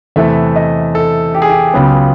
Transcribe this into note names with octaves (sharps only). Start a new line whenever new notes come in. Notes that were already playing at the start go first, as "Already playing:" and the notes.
E2 C3 E3 A3 E5
D#5
A4
G4
G#4
G4
C#2 C#3 F#3 B3